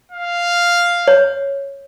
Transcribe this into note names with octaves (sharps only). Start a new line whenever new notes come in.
F5
C#5